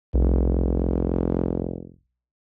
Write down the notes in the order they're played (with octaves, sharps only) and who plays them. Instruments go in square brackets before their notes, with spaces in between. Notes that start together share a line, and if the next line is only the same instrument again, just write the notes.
[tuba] F1 [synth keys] B1